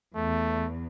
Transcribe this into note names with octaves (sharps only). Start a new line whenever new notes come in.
E2 A3